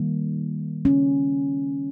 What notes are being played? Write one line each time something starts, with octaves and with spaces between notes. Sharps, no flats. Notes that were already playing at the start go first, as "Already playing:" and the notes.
Already playing: D#3 G3 A#3
C#4